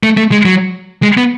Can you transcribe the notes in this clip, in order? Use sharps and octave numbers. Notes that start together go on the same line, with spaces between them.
A3
A3
G#3
F#3
G#3
B3